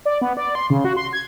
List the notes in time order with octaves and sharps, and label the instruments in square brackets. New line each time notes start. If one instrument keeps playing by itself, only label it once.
[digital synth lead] D5
B3
D5
C6
C#3
F#4
C6
G#6